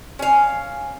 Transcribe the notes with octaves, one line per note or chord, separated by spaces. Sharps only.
C#4 F5